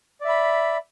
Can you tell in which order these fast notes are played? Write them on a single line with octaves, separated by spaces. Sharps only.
D5 E5 B5